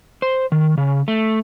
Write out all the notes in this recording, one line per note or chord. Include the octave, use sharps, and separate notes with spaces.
C5
D#3
C#3
A3